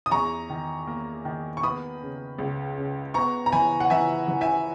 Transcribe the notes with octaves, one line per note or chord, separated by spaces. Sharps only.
D#6
E2 A#5 C#6
D#3
A#3
D#3
C#6
B3 B5 D#6
C#3
C#2
C#3
B3 A#5 C#6
A#5
E3 G#5 B5
F#5
E3 E5 G#5
E3
E5 G#5